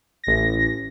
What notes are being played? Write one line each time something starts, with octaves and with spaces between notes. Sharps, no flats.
A1 A#6